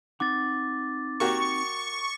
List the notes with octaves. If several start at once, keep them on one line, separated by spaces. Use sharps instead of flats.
C4 D#4 F#5 D6 A6
A#3 F#4 G4 C#6